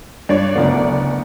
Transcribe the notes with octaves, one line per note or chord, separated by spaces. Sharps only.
G2 C#5 D5
F#1 D2 B3